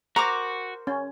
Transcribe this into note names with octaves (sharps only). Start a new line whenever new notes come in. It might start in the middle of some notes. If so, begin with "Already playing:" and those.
F#4 A#4 C5 A#5 D6
C#4